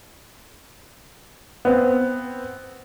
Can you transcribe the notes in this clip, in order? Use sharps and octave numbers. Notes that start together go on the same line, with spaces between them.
B3 C4